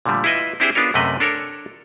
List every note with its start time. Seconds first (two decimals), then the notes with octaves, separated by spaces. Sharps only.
0.06 A#2 D3 F3 G3 A3
0.24 E4 F4 B4 D#5 E5
0.60 C4 D4 E4 G4 G#4 C5
0.75 B3 D4 F4 G#4 A#4 C#5
0.94 F#2 C3 A3 B4 D#5
1.20 D4 A4 A#4 C#5